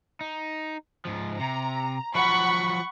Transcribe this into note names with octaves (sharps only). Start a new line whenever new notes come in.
D#4
G#2 F3
C3 A#5
F3 F#3 F#5 B5 C#6